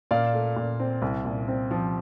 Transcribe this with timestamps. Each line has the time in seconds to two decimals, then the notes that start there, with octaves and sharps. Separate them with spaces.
0.11 A#2 D5 F5
0.33 A3
0.56 A#2
0.80 C4
1.02 C2
1.25 A#2
1.48 C4
1.71 F3